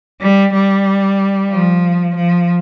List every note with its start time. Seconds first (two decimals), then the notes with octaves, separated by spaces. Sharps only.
0.21 G3
0.54 G3
1.50 F3
2.15 F3